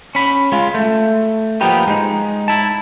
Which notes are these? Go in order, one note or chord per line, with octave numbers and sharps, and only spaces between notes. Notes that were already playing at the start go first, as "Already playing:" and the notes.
C#4 B5
G#3 F4
A3
F3 A#3 B3 D#4 G4 B4
G#3 D#4
E4 A5